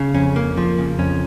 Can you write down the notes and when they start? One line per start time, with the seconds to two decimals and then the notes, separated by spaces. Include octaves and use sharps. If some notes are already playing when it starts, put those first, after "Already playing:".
Already playing: C#3
0.14 F2 C#4
0.36 A#3
0.57 F3
0.78 C#3
0.99 F2 C#4